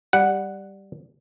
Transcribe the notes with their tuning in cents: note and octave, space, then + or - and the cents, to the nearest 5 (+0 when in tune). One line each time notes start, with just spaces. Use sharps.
G3 +0 F#5 +0